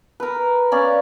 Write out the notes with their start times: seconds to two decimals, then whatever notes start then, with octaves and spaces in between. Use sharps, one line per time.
0.20 A#4 B4
0.72 C#4 D5 F5